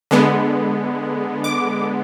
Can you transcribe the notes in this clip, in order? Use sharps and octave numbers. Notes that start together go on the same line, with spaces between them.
D3 G#3 B3
D6